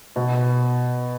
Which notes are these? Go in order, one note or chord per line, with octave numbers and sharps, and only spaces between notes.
B2